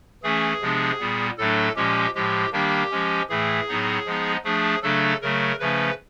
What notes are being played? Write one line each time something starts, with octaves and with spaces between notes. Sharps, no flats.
E3 A3 C#4 G#4
C3 F3 G#3 B3 D4
A#2 G3 B3
A2 F#3 A3 D4 A4
A#2 F3 G#3 C#4 G4
A2 F3 G#3 G4
D#3 G3 A#3 D4 G4
F3 G#3 C#4
A2 E3 A3 G#4
A2 F#3 B3 D#4
F3 G#3 B3 D#4
F3 A3 D4 G#4
C#3 F#3 A3 D4 A4
C#3 F#3 A3 A#4
C#3 F3 A3 C#4 B4